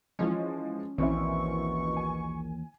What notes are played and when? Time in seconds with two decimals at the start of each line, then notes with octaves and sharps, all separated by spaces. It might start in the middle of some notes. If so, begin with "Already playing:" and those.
0.19 E3 F3 G#3 C#4
0.98 A#1 D#2 B2 E3 C4 C#4 E4 C#6
1.96 G#5